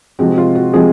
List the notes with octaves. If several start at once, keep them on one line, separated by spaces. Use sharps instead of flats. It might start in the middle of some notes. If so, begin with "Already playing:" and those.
C3 F3 G#3 C4 F#4
F4
F#4
C3 F3 G#3 C4 G#4